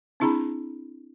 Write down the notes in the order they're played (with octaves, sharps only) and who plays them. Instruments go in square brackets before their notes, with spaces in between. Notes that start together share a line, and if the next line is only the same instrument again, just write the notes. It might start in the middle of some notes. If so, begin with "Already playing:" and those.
[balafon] C4 D4 E4 G#4 A#5 B5